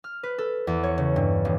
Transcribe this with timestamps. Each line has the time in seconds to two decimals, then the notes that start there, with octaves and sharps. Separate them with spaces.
0.04 F6
0.23 B4
0.38 A4
0.67 E2
0.83 C#5
0.98 C#3
1.16 G2
1.45 D#1